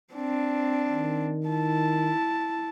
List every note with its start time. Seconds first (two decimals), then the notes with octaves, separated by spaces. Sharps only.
0.13 C4 D4
0.90 D#3
1.47 E4 A5